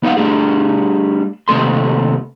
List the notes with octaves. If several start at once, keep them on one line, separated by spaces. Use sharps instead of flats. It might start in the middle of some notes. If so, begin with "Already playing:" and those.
B3 D#4 F5 F#5
G3 A3 D4 G#4
D#2 C3 A3 A4 C6